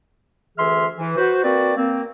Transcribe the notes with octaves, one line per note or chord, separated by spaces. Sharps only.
D2 E3 G#4 E5 C6 F6
E3
F#4 B4 C5
A#3 C4 F#4 B4 D5
A#3 C4